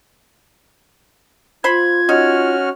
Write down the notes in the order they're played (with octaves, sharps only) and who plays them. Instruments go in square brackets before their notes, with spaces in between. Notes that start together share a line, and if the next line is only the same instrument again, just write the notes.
[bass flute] F4 [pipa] C5 B5 [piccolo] G#6
[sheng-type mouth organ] C#4 F#4 F6 [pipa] D#4